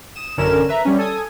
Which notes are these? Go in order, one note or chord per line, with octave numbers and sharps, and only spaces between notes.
D#6 E7
A1 F#2 D3 C#4 A#4 E7
B4 E5 A#5
G3 C#4
A4 G#5 D#6